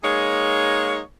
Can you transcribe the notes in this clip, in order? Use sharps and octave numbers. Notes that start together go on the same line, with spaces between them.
G#3 A#3 D#4 G#4 C#5